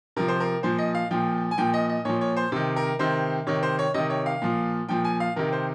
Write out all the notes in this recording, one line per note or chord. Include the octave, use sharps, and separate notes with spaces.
C3 F3 A#4
C5
A#4
A#2 F3 C5
D#5
F5
A#2 F3 G5
G#5
A#2 F3 G5
D#5
D#5
A#2 F3 C#5
C#5
C5
C3 D#3 C5
A#4
C3 D#3 C5
C3 D#3 C#5
C5
C#5
C3 D#3 D#5
C#5
F5
A#2 F3
A#2 F3 G5
G#5
F5
C3 D#3 A#4
C5